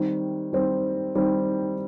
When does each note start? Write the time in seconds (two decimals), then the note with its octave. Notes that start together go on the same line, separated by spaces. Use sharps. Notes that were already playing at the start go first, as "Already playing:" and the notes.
Already playing: D#3 G3 C4
0.53 D#3 G3 C4
1.15 D#3 G3 C4